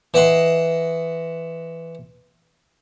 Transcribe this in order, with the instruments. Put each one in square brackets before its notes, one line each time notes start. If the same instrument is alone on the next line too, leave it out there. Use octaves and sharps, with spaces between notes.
[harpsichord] E3 D#5 F#5 C6